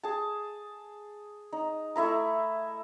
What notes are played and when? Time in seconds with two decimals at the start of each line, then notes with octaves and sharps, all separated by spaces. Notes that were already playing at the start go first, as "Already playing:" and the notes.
0.03 G#4 A5
1.53 D#4
1.96 A3 E4 E5 A#5